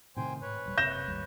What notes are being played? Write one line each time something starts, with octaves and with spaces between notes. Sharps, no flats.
A2 C3 D#3 C5 G5 G#5
G#2 B4 C#5
D#1 G3
F#1 C3 G6 A#6 E7
G#1 D#2 G3